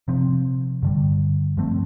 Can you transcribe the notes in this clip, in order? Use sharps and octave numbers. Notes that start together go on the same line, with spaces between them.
C3 F3 C4
G2 D3 G3
G2 F3 A3 C4